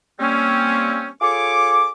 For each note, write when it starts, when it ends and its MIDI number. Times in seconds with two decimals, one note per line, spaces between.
0.19 1.08 55
0.19 1.08 58
0.19 1.08 60
0.19 1.08 61
1.21 1.88 65
1.21 1.88 68
1.21 1.88 69
1.21 1.88 73
1.21 1.88 86